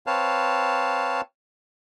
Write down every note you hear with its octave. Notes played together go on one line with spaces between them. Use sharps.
C4 B4 C#5 F5 A5